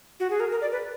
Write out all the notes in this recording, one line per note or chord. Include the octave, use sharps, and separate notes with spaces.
F#4
G#4
A#4
A#4
D5
B4